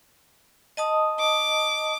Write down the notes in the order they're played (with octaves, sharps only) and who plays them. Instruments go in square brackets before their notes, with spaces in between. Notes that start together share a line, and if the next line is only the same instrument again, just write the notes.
[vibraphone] D#5 A5 D#6
[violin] D6